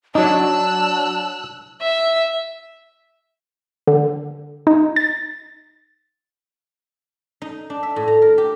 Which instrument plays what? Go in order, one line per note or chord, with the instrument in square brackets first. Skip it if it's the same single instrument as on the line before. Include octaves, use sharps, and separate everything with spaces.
[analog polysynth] F#3 D4 [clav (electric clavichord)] D#4 [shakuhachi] A5 [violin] E6 F#6
[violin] E5
[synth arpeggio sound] D3
D#4
A6
[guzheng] D#4
D4
E5
A2
A#5
A#4
G4